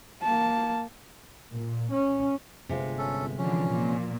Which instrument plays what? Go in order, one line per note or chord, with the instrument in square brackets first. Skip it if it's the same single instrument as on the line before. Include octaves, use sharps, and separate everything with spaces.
[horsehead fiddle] A#3 A5
[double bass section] A#2
C#4
[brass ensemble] G1 [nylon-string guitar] C3 G#3 F4
[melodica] C#4 A4
[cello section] D3 E3 [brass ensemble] F3 [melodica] C#4
[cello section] A#2